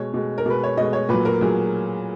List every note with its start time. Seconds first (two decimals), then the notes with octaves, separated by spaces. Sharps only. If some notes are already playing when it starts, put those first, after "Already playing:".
Already playing: B2 G#3 C#5
0.14 B2 G#3
0.38 A#4
0.46 B2 G#3 B4
0.64 C#5
0.77 B2 G#3 D#5
0.93 C#5
1.09 A#2 F#3 B4
1.25 A#4
1.41 A#2 F#3 G#4